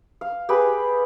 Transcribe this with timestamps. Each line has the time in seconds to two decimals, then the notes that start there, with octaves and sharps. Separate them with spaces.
0.21 F5
0.49 G4 G#4 B4 B5